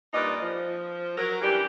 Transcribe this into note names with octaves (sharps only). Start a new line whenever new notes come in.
G2 A#2 D#4 B4 D5 D#5
F3
F#3 A#4
C#3 E3 G3 D4 G4